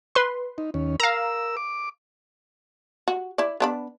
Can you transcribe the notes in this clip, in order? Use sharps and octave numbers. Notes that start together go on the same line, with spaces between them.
B4 C6
D#4
D#2 C#4
A#4 F5 A#5 E6
D6
F#4
E4 D5
B3 D4 B5